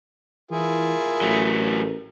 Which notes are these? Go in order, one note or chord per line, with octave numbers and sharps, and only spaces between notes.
E3 E4 F4 G#4 A#4
A1 F#3 A3